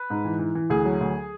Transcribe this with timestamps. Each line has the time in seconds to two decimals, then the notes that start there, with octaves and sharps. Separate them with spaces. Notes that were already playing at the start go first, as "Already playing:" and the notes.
Already playing: B4
0.10 G#2
0.25 E3
0.39 E3
0.55 E3
0.70 D2 G#4
0.85 F#3
1.01 D2